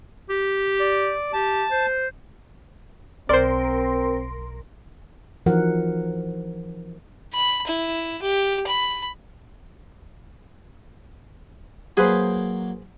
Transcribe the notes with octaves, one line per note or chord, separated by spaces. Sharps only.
G4
D5
G4 A5
C5
B1 C4 A#4 C5 D5 C6
E3 F3 D#4 F#4 A#4 F#5
B5
E4
G4
B5
F#3 A#3 G#4 B4 C5